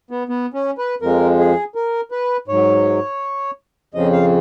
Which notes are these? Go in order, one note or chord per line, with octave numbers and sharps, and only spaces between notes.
B3
B3
C#4
B4
F2 F3 G#3 A#4
G#4
A#4
B4
G#2 F#3 C#5
F2 C#3 F3 D#5
F5